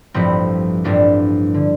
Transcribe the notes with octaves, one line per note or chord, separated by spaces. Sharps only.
A1 G2 F3 C4 E4
A1 G2 F3 D4 F4
D3